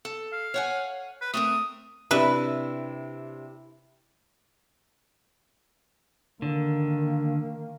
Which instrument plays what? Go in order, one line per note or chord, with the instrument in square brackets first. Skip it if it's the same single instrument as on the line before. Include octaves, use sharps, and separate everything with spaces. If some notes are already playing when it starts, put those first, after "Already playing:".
[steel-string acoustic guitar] A4
[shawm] F5
[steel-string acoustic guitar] C#5 F#5 G#5
[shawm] B4
[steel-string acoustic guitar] A3 C4 A#4 [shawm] D#6
[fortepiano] C3 D4 [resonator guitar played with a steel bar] E4 [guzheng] B4 E5
[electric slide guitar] D3 [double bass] D#3 A#3